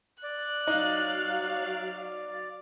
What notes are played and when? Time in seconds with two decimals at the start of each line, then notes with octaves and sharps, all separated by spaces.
0.23 D5 F#6
0.67 F#3 D#4 F5